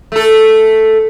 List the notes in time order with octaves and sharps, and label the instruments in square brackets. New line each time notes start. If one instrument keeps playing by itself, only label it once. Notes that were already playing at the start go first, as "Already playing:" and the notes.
[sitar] A3 A4